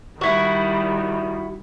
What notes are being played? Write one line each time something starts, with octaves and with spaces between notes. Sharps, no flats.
D#3 G3 E4 F#4